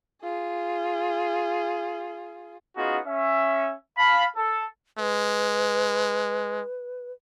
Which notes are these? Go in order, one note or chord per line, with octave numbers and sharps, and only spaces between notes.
F4 G#4
B3 C#4 D#4 F4 F#4 G#4
C#4 E5
F5 A5 B5
A4
G#3 B4